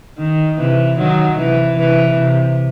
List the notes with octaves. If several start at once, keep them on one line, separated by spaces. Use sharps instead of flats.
D#3
C3 E3
D#3 F#3
C3 E3
C3 E3
C3